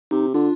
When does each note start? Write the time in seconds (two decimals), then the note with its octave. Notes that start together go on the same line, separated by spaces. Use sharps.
0.11 C3 D#4
0.34 D3 D4 F4